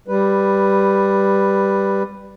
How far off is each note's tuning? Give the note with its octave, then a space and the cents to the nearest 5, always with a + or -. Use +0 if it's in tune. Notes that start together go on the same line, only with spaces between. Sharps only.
G3 +0 B4 +0